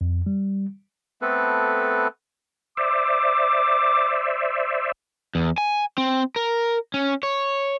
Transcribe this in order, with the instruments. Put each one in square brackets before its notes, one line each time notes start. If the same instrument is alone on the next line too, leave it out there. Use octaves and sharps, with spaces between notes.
[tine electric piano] F2
G3
[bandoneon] A3 B3 C4 A4 B4
[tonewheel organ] C5 D5 E5 [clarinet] D6
[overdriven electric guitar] E2
G#5
C4
A#4
C#4
C#5